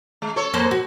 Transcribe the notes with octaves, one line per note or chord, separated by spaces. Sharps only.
G#3
A4 C#5
F2 A#3 C5
F#4